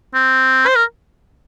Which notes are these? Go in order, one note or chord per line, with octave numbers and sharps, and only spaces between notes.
C4
C5
A#4